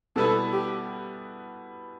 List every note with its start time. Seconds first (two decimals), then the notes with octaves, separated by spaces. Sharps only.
0.16 B2 G3 B3 E4 A4 B4
0.53 G4